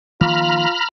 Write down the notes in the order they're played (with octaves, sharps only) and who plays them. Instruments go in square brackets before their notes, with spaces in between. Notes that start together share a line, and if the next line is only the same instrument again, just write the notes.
[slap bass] D#3 F3 A#3 [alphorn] F4 [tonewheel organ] A#5 B5 F6